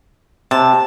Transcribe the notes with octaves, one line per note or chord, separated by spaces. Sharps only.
C3 A5